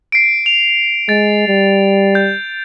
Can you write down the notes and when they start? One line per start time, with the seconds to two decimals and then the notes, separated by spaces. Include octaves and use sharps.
0.12 C7 D7
0.46 F7
1.09 G#3 A6
1.48 G3
2.15 G6